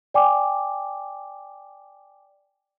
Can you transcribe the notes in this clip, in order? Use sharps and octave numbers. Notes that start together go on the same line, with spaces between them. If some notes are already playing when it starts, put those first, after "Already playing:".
D5 G5 G#5 D6